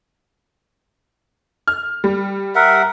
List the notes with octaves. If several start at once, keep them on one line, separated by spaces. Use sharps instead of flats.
F6
G3
A#4 E5 F#5